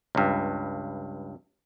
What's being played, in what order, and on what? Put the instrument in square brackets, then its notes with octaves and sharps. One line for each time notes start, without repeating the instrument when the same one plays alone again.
[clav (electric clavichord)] C#2 G2